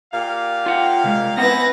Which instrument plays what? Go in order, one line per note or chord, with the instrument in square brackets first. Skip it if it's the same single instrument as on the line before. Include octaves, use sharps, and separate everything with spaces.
[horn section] A#2 G4 F5
[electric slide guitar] F4 F#5 G5
C3 G3 G#3
[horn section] E3 E4 [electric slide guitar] B3 C4 F#5 [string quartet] B4 A#6